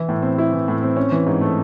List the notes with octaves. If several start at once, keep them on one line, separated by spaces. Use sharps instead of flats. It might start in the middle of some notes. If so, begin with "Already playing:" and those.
Already playing: E3 E4
A2
C4
E4
E3
A2
C4
C#4
E3
G#2
A3